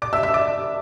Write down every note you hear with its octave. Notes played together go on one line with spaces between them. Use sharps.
D5 D6
E5 E6
E5 E6
D5 D6